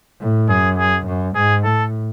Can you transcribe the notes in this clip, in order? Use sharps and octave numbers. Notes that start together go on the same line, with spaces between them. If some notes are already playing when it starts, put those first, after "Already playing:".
A2
F#2 G#4
G#4
F#2
G#2 G#4
A2 A4